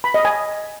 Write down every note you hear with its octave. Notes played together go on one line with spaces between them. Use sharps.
B5
D#5
G#5